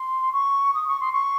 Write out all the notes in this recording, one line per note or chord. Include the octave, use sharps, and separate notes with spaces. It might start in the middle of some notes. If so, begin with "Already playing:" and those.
Already playing: C6
C#6
D#6
C#6
C6
C#6